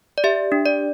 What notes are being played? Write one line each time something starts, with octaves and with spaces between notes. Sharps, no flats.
D5
G4 E5
D4
D5